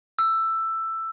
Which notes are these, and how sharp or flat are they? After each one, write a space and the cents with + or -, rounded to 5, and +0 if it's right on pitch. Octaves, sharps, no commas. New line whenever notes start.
E6 +10